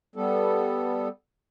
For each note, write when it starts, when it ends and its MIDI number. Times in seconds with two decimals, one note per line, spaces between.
0.16 1.08 55
0.16 1.08 59
0.16 1.08 69